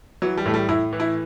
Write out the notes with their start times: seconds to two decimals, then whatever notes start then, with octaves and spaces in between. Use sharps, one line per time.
0.22 E3 F#3
0.37 G3
0.45 A2 A3
0.54 G3
0.69 A2 E4
0.93 E3
1.00 E4